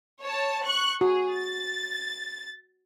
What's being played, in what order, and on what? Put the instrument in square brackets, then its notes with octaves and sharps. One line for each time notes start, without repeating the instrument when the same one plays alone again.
[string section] C#5 A5
C#6 F#6
[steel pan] F#4 [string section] G#4
[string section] A6